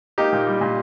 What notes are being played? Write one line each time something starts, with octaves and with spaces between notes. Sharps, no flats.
A#3 D#4 G4
A#2
G3
A#2